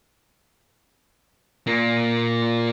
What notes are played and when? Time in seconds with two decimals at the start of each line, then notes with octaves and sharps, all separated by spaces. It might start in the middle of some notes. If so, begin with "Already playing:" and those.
1.67 A#2 A#3